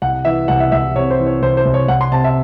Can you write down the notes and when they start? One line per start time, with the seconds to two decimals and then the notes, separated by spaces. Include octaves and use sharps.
0.02 C2 F#5
0.25 E3 E5
0.48 C2 F#5
0.60 E5
0.72 C2 E5
0.95 C3 C#5
1.11 C5
1.19 E3
1.27 C#5
1.42 C2 C5
1.57 C5
1.65 C2
1.74 C#5
1.88 C2 F#5
2.01 C6
2.12 C3 A5
2.24 E5